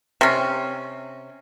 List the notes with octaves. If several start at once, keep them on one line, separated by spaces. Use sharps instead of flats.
C3 C#4